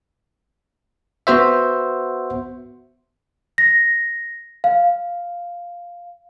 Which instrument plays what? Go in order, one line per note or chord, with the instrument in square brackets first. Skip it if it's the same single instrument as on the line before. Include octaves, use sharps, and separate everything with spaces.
[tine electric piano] B3 F#4 C5 E5
[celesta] A#6
F5